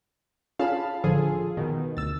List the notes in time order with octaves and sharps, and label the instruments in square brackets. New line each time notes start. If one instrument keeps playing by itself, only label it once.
[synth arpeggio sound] C#4 F4 G#4 [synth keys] F5 A5 B5
[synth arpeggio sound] A1 D3 F3 [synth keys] F4 G#4 A4
[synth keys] B2 D#3
[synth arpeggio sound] D2 [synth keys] E6 A6